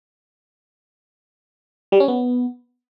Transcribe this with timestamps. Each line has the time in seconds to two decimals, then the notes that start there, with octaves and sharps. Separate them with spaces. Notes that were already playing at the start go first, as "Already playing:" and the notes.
1.92 G3
2.00 C#4
2.08 B3